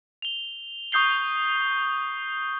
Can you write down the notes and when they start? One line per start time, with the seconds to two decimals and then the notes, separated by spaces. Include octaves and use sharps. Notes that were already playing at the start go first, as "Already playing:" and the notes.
0.22 F7 G7
0.92 C#6 D#6 G6 C7 G7